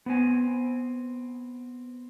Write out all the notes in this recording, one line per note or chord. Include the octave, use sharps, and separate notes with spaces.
B3 C4 G#5